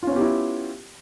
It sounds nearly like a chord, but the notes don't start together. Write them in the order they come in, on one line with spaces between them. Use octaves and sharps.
F4 C#4 B3 G4 E4